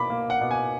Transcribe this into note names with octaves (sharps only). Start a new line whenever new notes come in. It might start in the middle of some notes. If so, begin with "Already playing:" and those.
Already playing: B2 A#3 B5 D6
A#3
F#5
B2
G#5